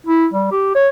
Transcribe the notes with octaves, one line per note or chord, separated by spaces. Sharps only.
E4
G3
G4
C#5